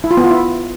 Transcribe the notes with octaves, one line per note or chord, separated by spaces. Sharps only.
E4
F4
B3
F4
E4